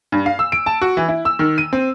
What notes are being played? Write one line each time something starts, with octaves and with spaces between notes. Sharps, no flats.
G2
F5
E6
D7
A5
F#4
E3
E4
E6
D#3
D#7
C4